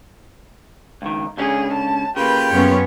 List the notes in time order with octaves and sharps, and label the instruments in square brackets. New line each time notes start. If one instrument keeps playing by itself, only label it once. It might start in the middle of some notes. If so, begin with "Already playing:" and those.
[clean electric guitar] C#2 D#3
[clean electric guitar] C#2 D3 C#4 [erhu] G#4
[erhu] A5
[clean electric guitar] C#3 A#3 [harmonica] F4 G4 G5 [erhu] B4
[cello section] F#2 B3 C#4 [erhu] C#5